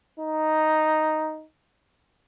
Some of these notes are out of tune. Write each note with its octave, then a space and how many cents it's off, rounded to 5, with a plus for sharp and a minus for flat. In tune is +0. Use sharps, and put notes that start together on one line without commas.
D#4 +0